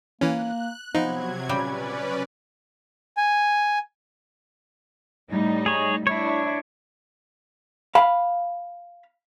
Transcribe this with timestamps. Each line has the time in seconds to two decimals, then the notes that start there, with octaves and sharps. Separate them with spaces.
0.21 E3 A#3 C#4 F#6
0.95 C3 F3 F#3 B3 D#4 G#6
1.49 A#2 C#3 G3 C#4 B4 D5 G5
3.17 G#5
5.31 A2 G3 D#4
5.66 G#4 C#5
6.07 D4 E4 C#5
7.95 F5 B5